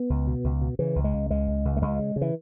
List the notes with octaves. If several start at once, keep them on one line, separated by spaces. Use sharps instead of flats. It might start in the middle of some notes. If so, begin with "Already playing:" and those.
Already playing: B3
C#2
B2
C#2
B2
C#3 E3
C#2
G#3
C#2
C#2 G#3
C#2
C#2
A3
C#2 G#3
C#3
C#3
E3